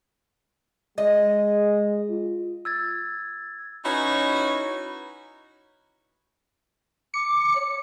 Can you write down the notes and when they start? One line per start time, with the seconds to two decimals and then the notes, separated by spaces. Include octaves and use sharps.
0.98 G#3 D#5
2.09 F4
2.65 E6 G#6 A6
3.84 C#4 D#4 E4 F#4 B4 C#5
7.14 D6 C#7
7.55 C#5